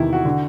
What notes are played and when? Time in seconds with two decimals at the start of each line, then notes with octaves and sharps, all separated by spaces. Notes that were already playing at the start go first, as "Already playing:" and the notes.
Already playing: E2 C3 D#3 E4
0.13 F#4
0.25 D3